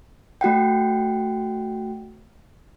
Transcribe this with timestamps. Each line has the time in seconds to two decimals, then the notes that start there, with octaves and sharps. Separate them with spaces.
0.41 A3 F#4 F#5 G5